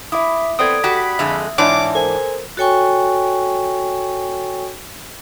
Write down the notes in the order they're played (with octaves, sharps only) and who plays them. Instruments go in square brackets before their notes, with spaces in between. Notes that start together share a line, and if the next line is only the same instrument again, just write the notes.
[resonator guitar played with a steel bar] E4 [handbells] E5 D6 D#6
[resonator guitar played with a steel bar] B3 [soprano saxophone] C4 [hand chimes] A4 D5 D7 [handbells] D#6 G#6
[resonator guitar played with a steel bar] F#4 G4 D5 [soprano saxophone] B5 [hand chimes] B6
[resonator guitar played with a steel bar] F2 D3 G#3 [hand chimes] E5
[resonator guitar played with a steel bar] G#2 E3 D4 [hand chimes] C#5 D5 E5 [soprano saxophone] D6
[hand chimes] A4 A#4 C5 [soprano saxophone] G#5
[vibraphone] F#4 A4 C#5 G5 G#5 C#6